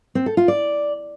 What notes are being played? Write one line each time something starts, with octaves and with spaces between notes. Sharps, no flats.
C4
A4
F4
D5